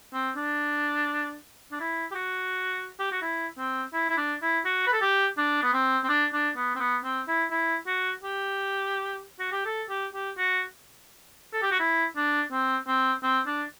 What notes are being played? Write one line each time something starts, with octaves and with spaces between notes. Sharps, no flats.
C4
D4
D4
E4
G4
F#4
G4
F#4
E4
C4
E4
E4
D4
E4
F#4
B4
A4
G4
D4
B3
C4
C4
D4
D4
B3
C4
B3
C4
E4
E4
F#4
G4
F#4
G4
A4
G4
G4
F#4
A4
G4
F#4
E4
D4
C4
C4
C4
D4